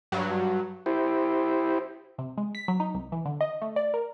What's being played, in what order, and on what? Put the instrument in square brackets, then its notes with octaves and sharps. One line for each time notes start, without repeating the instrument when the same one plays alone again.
[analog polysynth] G2 F#3
[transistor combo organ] E4 G4 C5
[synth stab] C3
G#3
B6
F#3
D#4
C2
E3
D3
D#5
A3
D5
A#4